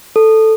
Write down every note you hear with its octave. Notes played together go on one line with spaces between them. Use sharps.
A4